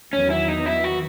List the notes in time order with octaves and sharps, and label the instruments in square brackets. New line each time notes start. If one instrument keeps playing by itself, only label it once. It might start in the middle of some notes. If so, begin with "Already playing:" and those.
[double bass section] E2 D#3 F#3 B3 [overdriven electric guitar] C#4
[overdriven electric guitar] E4
D#4
E4
F#4